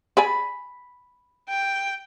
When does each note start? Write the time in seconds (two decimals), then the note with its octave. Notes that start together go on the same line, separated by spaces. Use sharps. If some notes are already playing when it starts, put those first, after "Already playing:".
0.17 G#4 D5 G#5 B5
1.49 G5